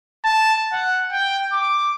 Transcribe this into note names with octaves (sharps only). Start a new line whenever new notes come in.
A5
F#5
G5
D6